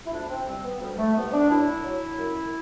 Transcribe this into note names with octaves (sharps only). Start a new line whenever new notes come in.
E4
D2 D4
C4
C3 E3 G3 C4
B3
D2 G3
A3
C3 E3 G3 B3
D4
F#2 E4
F#3
F#2